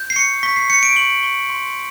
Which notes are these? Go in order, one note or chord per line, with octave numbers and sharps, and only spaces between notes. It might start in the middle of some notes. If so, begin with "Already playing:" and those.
Already playing: G6
C7
C#6 C#7
C#6 B6
C7
G6 C#7
D7
C#6 F#7
C#6
C6